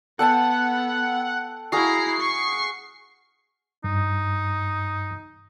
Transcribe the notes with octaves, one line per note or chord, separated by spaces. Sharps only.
B3 A4 F#5 G5 A5
E4 F#4 G#4 F5 A#5 C7
C#6
G2 D#4